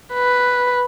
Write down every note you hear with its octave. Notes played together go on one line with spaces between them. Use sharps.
B4